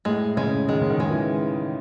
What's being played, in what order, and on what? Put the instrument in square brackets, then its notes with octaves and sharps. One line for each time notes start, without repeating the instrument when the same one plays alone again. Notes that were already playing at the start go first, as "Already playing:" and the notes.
[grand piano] A2 [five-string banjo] G#3
[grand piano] C#3 [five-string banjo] G#3
[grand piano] D#3 [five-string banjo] G#3
[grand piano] C#3
D#3
[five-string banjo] G#3
[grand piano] E3